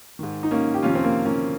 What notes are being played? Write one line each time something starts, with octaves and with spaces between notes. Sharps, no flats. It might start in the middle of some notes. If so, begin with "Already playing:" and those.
G#2 D#3
D#4
A#3 C#4
G4
F2 C3 D#3 C#4 F4
C4
A#3
A#3 C#4